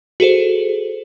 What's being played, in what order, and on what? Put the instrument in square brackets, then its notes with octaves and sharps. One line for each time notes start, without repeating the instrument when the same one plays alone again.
[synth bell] F#4 G#4 A4 C5